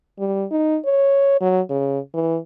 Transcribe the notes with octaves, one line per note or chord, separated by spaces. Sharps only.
G3
D#4
C#5
F#3
C#3
E3